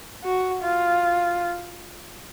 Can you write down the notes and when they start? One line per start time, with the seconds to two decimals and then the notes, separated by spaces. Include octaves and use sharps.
0.24 F#4
0.62 F4